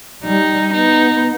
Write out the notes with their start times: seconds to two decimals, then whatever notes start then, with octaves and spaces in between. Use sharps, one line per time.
0.24 G3 D#4
0.73 B3 D#4